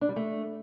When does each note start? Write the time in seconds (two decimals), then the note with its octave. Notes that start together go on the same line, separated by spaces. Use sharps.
0.01 D4
0.09 G3
0.16 A3